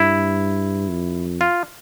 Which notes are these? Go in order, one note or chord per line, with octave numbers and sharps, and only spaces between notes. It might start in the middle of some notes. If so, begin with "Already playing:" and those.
Already playing: G2 E4
F2
F4